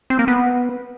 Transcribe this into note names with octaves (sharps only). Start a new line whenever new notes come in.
C4
A#3
B3